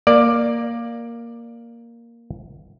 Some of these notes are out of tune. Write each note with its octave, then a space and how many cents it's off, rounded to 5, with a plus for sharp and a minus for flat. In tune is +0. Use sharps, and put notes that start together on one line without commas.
A#3 +0 D5 +10